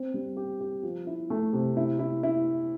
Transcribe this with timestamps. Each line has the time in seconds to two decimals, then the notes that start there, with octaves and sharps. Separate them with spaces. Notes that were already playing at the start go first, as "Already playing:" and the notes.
Already playing: C4
0.14 G3
0.37 G4
0.61 G4
0.83 F3
1.07 E4
1.30 A3
1.53 C3
1.77 E4
1.99 E4
2.23 E4